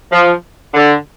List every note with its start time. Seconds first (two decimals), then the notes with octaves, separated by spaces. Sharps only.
0.11 F3
0.74 D3